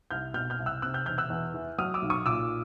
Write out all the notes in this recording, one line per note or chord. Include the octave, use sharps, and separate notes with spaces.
C2 F6 G6
B2 F6 G6
F6 G6
C2
E6 F#6
C3 E6 F#6
F6 G6
E1 F6 G6
E6 F#6
E2
E3
F#3 D#6 F6
D6 E6
B1
C#6 D#6
A#2 D6 E6